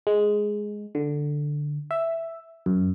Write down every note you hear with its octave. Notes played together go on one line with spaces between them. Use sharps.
G#3
D3
E5
F#2